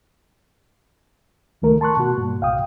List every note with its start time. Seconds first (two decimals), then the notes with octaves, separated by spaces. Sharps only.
1.62 C#2 D#3 A3 A#4
1.81 A5 C6 C#6 F#6
1.97 B2 F#4
2.18 G2 A#2
2.41 C2 F5 G5 D#6